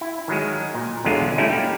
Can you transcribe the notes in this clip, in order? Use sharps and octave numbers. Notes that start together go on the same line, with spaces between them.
E4
D#3 F#3 G#3
A#2
B1 E2 D3 F#3 G#3 F4
G3 A3 C#4 D#4 E4
A#3 G4